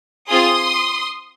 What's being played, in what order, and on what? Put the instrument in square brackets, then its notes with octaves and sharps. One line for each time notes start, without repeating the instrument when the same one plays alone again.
[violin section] C4 F4 G#4 C6 D#6